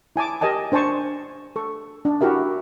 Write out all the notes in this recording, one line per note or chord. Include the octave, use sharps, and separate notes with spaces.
E4 G#5 A5 D6
G4 A#4 D#5 G#5 A5
D4 C5 G#5 A5 C#6
A4 C#6
D4
E4 F#4 G4 A#4 E5